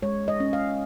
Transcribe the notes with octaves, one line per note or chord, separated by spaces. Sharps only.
G#3 C#5
D#5
C#4
F5